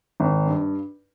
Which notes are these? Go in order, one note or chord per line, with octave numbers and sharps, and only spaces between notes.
G#1
G2